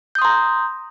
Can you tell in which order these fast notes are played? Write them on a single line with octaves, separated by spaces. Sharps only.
G6 D#6 C6 A#5